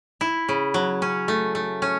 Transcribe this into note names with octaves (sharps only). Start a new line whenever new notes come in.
E4
C#3
F#3
C#4
A3
A3
C#4